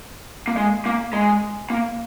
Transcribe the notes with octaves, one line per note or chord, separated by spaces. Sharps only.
A#3
G#3
A#3
G#3
A#3